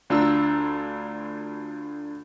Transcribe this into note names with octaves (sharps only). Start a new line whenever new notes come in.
D2 D4 F4 A#5 E6